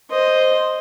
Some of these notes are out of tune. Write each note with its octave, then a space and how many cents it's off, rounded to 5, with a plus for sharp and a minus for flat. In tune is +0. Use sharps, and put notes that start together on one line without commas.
C5 +0 D#5 +0